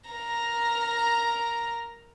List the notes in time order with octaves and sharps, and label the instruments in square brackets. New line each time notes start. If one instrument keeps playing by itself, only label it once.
[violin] A#4 A#5